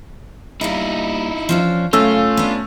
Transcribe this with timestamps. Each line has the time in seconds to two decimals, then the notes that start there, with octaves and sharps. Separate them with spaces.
0.61 G3 A#3 D#4 E4 D#5
1.49 F3 C#4 D4
1.93 F#2 C#3 A3 C#4 F4 E6
2.37 B3 D4